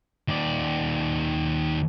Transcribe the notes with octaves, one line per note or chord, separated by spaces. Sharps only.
D#2 D5